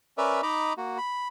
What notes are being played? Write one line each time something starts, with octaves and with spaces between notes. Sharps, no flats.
C#4 A#4 B4 D5 E5
D#4 D#5 A#5 B5 D6
A#3 F#4
B5